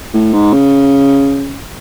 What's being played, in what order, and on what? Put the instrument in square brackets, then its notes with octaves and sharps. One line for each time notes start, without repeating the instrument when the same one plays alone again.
[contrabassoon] A2
G#2
C#3